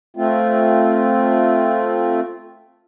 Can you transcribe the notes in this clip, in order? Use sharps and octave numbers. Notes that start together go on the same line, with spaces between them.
A3 C4 F4